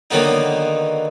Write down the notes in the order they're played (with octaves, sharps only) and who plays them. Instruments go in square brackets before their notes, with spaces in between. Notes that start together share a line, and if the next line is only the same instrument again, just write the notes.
[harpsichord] D3 D#3 F#3 A#3 B3 D#4